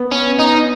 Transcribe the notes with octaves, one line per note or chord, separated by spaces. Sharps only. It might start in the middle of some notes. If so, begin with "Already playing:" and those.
Already playing: B3
C#4
D#4